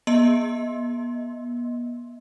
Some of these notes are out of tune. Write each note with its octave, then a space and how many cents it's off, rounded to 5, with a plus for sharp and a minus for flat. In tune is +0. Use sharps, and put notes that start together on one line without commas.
B3 -35 D#5 +10 C6 +15